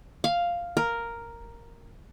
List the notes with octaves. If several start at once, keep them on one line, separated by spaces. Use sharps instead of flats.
F5
A#4